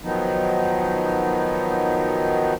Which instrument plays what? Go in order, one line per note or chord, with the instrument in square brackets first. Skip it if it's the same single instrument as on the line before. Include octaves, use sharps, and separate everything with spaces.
[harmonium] D#3 F3 F#3 B3 D#4